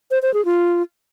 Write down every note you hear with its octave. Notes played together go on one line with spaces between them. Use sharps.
C5
C5
G#4
F4